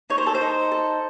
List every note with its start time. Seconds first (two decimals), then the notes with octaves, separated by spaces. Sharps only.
0.10 D#4 C#5
0.18 C5
0.26 A4
0.35 C5
0.41 D#4
0.72 A4